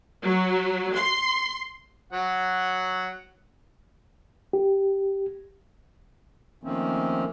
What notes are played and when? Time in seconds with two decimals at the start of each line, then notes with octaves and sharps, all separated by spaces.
0.22 F#3
0.94 C6
2.12 F#3 F#5
4.53 G4
6.63 D#3 F3 A3 A#3 C4 C#4